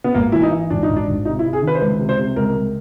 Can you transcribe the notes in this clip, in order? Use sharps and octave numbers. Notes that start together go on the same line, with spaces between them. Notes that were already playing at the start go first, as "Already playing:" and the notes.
B3
G#1 A#3
E3 E4
D#4
E3
G#1 D4
D#4
G#1
D4
G#1
C3 D#4
E4
C3
G#4
D#3
B4
C5
C#2 B4
C3
C5
C3
C#2 A#4
C#2